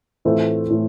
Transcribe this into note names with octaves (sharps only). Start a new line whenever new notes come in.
A2 E3 A3 C4 F4
A2 E3 A3